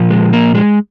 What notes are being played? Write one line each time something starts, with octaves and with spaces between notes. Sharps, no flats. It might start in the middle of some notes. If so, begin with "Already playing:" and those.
Already playing: A#2 F3
G#3
A#3
G#3